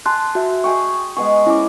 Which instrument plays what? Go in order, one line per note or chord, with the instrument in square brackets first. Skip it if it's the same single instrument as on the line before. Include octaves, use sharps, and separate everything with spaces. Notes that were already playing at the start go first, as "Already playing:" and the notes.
[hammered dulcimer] G#4 [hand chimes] A5 C6 F#6
[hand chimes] F#4 E5
[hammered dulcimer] G#4 G5 [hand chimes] C#6
[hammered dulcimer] G#3 B3 G#4 [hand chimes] C#6
[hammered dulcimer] C#4 [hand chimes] E4 D6